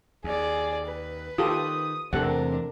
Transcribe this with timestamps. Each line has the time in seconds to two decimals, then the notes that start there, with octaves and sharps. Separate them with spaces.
0.24 D#2 G#4 D5
0.86 B4
1.38 D#3 F4 G4 A4 D#6
2.13 E2 C3 E3 A3 D4 A4 A#4 F#5